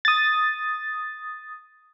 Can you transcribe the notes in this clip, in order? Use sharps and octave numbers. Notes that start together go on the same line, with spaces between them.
D#6 A6